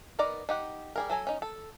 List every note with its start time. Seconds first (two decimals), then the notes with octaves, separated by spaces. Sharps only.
0.19 B3 D#4 A#4 D5 A#5
0.49 D#4 G4 F#5
0.96 G3 G#4 A#4
1.10 F#3 A4 G#5 A#5
1.27 C#4 D#4
1.42 A4